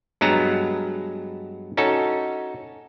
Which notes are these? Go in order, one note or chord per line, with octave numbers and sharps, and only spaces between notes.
G2 F#3 G#3 B3 A5 A#5
C#4 D#4 F#4 A4